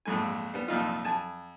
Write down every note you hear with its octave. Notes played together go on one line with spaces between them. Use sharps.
A#1 F2 G#2 A3 G#5
G3 B3
C2 F2 A#2 D#4 F4
F2 G#5 A5